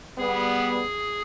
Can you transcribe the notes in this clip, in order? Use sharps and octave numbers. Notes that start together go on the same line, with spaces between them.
G3 B3 G#4